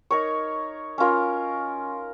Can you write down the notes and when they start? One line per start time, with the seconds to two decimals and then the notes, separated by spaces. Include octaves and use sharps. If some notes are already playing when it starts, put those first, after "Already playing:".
0.11 D#4 A#4 C#5
0.98 C#4 F4 A#4